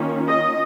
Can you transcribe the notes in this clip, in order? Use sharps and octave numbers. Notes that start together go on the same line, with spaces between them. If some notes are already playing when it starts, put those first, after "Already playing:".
Already playing: D#3 A#3 C#4 F4
D#5